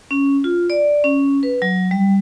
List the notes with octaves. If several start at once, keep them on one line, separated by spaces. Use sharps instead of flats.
C#4
F4
D5
C#4
B4
F#3
G3